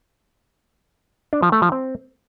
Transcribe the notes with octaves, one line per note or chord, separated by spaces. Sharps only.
D4
F3
A3
F3
C4